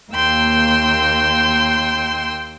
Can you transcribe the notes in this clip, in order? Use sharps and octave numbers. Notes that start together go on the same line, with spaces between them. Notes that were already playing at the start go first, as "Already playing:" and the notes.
D#2 A#3 G5 C6 E6